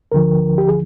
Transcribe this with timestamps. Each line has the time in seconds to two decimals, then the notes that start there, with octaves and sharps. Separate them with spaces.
0.12 D2 D3 F3 A#4
0.58 G4
0.68 G#4